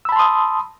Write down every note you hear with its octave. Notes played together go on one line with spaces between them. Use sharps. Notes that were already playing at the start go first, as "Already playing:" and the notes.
A5 B5 C6 D#6 E6